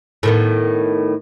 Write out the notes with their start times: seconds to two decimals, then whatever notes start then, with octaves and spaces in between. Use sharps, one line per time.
0.23 A2 D#3 B3